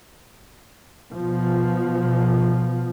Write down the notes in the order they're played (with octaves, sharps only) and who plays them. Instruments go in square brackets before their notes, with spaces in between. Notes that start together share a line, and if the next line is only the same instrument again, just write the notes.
[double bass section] B2 F3